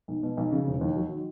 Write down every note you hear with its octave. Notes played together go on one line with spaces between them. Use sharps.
B1
B2
B1
C#3
E1
D#2
F#3
D#3